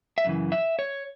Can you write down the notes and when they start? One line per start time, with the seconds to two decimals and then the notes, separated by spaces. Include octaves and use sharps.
0.18 E5
0.25 F#2 C#3 E3
0.52 E5
0.79 C#5